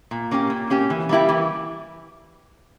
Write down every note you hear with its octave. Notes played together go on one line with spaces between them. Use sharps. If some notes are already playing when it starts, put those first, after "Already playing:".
A#2
A#3 C#4 G4
A#2
A#3 C#4 G4
E3
G3 A#3 E4 G4
E3